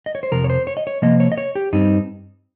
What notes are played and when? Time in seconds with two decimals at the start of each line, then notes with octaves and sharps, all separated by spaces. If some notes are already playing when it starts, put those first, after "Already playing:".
0.06 D#5
0.15 C#5
0.23 C5
0.32 F2 C3 F3 A#4
0.44 C#5
0.50 C5
0.67 C#5
0.77 D#5
0.87 C#5
1.02 C3 F3 A#3 D#5
1.20 C#5
1.32 D#5
1.38 C#5
1.55 G4
1.73 G2 G3 C4 D#4